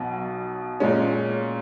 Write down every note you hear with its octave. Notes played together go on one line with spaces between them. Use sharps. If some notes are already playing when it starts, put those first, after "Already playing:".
Already playing: B1 B2 F#3
A#2 G#3 C#4